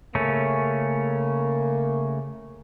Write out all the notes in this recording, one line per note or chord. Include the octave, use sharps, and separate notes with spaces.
C#3 A3 A#3 C#4